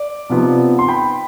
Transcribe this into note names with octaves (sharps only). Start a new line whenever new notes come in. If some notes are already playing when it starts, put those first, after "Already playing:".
Already playing: D5
C3 F3 B3 D#4
C6
G5 B5